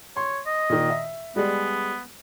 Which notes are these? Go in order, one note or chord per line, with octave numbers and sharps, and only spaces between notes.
C#5 C6
D#5
A#2 D#3
E5
G3 G#3 B3